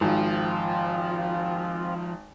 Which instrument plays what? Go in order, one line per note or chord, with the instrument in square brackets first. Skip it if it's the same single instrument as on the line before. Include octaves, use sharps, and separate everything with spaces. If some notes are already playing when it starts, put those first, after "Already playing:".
[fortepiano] G#1 [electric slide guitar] F3 [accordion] C4 F4